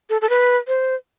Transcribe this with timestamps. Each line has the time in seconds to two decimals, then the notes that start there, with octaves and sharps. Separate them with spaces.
0.10 A4
0.22 A4
0.30 B4
0.68 C5